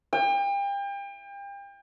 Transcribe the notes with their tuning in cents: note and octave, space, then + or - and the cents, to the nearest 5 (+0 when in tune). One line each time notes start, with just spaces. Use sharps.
G5 +35